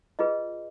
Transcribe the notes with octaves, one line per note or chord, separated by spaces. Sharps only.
F4 G#4 B4 D#5